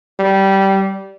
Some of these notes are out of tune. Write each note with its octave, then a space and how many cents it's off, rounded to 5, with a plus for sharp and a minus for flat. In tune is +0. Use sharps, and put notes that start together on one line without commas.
G3 -15